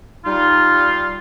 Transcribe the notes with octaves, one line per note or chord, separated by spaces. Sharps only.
G3 D#4 F4